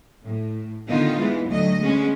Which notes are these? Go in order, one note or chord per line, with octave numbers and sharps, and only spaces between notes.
A2
D3 D#3 B3 D#4 F4
E3 G#3 B3
D2 F#3 A3 D#5
G#3 B3 C#4